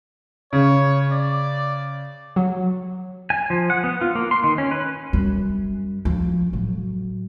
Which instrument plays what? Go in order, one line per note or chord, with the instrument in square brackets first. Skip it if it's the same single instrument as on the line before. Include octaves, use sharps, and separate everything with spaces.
[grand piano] C#3 [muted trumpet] C#5
[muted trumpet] D5
[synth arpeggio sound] F#3
[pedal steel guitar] G#5
F3
F#5
B3
F4
A#3
C6
D#3
C#4
B4
[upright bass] F#2 G3
F2 F3
A2 F#3